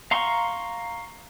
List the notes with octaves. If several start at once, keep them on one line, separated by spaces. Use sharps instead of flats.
F5 A#5 C6 C#6